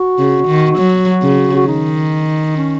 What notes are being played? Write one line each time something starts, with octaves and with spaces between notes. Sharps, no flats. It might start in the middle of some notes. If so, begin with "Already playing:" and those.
Already playing: F#4
C#3
D#3
F#3
C#3
F#4
D#3 D#4
C#4